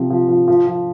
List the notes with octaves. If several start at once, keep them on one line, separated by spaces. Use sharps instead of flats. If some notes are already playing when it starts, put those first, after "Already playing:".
Already playing: C3 F3
F3
F3
F3
F3